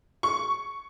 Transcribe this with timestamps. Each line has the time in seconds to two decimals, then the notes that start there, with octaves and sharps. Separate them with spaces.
0.23 C#6